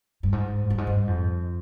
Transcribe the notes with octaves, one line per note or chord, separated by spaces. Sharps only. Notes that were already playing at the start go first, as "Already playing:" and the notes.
G2
G#2
G2
G#2
G2
F2